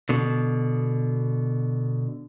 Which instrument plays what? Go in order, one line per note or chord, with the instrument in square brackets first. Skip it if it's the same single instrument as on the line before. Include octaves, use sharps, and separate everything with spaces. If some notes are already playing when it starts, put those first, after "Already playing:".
[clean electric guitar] B2 D3